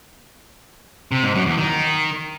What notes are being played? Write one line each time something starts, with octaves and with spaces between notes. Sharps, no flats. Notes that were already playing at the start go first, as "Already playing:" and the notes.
C3
G#2
F#2
E2
D#3